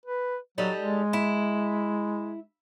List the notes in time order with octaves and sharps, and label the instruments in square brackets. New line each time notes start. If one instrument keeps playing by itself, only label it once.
[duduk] B4
[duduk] F#3 [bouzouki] G3 D#4 A4
[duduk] G#3
[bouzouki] E4